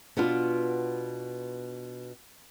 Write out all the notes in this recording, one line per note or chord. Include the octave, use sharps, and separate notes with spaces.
B2 B3 D4 F4